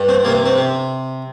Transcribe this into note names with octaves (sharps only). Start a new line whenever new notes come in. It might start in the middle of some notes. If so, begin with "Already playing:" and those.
Already playing: G2
C4
C3 A#3
C4
C3